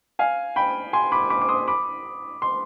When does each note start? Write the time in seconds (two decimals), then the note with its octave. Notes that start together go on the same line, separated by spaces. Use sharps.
0.19 F5 G#5
0.56 G5 B5
0.93 G#5 C6
1.12 B5 D6
1.30 B5 D6
1.42 D6
1.48 C6 D#6
1.68 B5 D6
2.42 C6